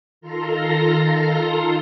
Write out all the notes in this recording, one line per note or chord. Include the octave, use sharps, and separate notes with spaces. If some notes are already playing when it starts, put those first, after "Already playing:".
D#3 F4 A4 A#5 C6 A#6